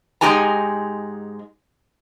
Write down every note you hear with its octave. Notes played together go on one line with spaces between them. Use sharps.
G#2 G#3 D#4 G4 G#5 A#5